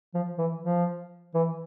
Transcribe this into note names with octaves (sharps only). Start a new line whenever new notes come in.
F3
E3
F3
E3